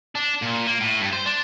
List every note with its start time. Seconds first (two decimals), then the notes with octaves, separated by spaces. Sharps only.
0.15 D4
0.42 A#2
0.67 A#3
0.81 A2
1.01 G2
1.13 C5
1.26 D4